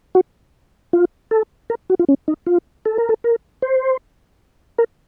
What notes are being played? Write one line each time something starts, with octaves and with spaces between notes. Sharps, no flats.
F#4
F4
A4
A#4
F#4
F4
C#4
D#4
F4
A4
A#4
A4
A#4
C5
A#4